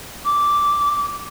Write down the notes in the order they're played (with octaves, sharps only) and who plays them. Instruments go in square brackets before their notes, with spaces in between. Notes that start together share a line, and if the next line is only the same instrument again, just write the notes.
[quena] D6